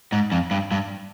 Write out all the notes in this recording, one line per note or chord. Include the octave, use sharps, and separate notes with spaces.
G#2
F2
G2
G2